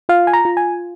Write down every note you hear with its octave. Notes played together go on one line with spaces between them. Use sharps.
F4 F5
G#5
A#5
F4
G#5